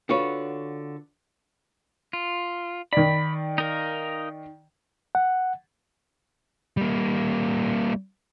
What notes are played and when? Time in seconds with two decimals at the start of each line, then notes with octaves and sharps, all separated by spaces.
0.09 D3 F4 F#4 B4 C#5
2.13 F4
2.93 D#3 D5 B5
3.58 D#4 A#4 F5
5.15 F#5
6.77 G3 A#3